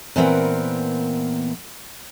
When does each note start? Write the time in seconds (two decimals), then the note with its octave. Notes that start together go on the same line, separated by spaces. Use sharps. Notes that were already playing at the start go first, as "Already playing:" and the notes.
0.16 A#2 E3 B3 C4 A#4 F#5